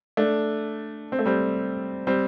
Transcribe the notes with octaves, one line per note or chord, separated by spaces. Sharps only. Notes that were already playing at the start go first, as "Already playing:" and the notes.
A3 D4
C4
A3
G3 C4
G3 C4